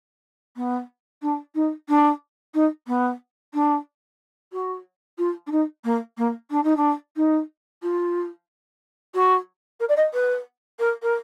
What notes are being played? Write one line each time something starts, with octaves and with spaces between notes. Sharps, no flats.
B3
D4
D#4
D4
D#4
B3
D4
F#4
F4
D4
D#4
A#3
A#3
D4
D#4
D4
D#4
F4
F#4
A#4
D5
D#5
B4
A#4
A#4